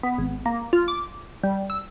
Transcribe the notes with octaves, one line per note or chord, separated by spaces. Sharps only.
B3
G#1
A#3
F4
D6
G3
E6